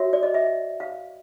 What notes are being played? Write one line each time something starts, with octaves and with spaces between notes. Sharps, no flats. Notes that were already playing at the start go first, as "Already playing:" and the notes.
Already playing: F#4 A#4 C#5 E5
D5
D#5
E5
F5